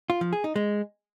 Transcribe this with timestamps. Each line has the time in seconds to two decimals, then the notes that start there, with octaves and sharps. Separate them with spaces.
0.10 F4
0.21 F3
0.33 G#4
0.44 D#4
0.56 G#3